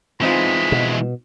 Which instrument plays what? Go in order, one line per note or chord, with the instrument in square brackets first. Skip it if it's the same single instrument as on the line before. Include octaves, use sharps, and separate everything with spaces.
[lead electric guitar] E3 G#3 [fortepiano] C4 D#4 F4 [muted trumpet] B5
[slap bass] B2